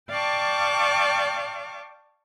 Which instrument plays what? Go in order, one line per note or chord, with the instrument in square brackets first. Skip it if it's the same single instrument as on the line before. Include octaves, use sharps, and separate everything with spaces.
[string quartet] D5 F5 G5 A5 C#6 D6